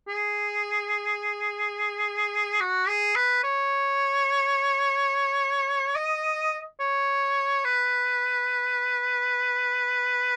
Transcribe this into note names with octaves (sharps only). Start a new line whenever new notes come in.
G#4
F#4
G#4
B4
C#5
D#5
C#5
B4